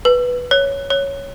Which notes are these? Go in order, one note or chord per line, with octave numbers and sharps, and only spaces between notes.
B4
C#5
C#5